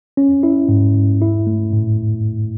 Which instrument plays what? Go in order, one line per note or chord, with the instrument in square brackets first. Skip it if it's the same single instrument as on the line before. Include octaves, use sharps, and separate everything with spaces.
[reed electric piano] C#4
E4
G#2
G#2
E4
A3
A2